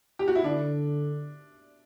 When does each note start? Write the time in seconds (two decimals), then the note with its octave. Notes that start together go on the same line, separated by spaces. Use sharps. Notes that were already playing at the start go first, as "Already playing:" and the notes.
0.19 G4
0.28 F#4
0.35 E4
0.44 D3 D4